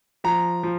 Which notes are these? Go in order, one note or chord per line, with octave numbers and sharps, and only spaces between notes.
F3 A#5
F3